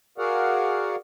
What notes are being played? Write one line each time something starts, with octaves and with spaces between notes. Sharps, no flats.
F#4 G#4 A#4 D5 F5 F#5